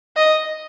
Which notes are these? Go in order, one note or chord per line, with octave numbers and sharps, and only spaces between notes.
D#5